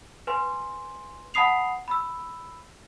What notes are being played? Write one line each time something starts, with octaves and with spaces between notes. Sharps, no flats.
B4 G#5 C6
F#5 A5 B5 D#6 C7 F7
B5 E6